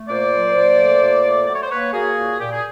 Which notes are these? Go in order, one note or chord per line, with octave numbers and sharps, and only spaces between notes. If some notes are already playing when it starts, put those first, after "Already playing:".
Already playing: A3
A#2 C5 D5
F#3
A#2
A3
A#2
A3
F#3 D5
C#5
C5
A#3 B4 C#5
A#3 F#4 G#4
A#2
A#2 G4
G#4